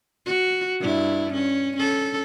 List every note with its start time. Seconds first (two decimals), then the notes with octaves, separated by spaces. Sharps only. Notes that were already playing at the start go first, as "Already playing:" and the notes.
0.26 F#4
0.80 G2 E4
1.34 C#4
1.77 C#4 A4